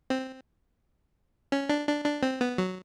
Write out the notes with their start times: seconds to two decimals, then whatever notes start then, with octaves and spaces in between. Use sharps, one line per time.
0.10 C4
1.52 C#4
1.69 D4
1.88 D4
2.05 D4
2.23 C4
2.41 B3
2.58 F#3